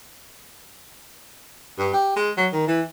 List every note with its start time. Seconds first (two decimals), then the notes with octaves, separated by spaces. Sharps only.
1.79 G2
1.94 G4
2.16 G#3
2.37 F#3
2.52 D#3
2.67 E3